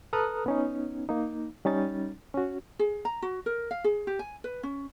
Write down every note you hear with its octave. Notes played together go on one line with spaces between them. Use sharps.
A4 B4 A#5 D#6 F6 F#6
B3 C#4 D#4
A#3 D#4
G3 C#4 D#4 A6
C#4 F#4
G#4
A#5
F#4
A#4
F5
G#4
G4
G#5
B4
C#4